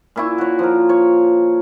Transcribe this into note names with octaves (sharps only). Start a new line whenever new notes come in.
A#2 E4 C#6
F#4 C#5
F3 A#4
C#5